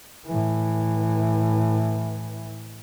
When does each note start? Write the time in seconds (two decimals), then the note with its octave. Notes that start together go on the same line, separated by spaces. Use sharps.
0.28 A2 E3